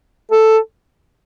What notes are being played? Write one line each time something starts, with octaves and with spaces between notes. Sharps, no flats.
A4